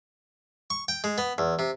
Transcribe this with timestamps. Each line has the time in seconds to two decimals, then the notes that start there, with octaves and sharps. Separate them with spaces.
0.70 C#6
0.88 G5
1.04 G#3
1.18 B3
1.38 E2
1.59 C3